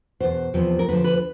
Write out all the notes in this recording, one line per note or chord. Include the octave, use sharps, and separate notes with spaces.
E2 B2 C5
E2 C3 F3
A#4
D2 D3 F3 B4
B4